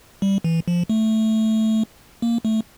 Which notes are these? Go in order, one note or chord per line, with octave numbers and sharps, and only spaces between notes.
G3
E3
F3
A3
A#3
A3